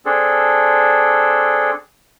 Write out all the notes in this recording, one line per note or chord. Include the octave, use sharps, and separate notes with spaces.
C4 D4 G#4 A4